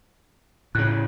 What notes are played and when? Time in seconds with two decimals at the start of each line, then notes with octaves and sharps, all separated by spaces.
0.75 A2 C#3 F#6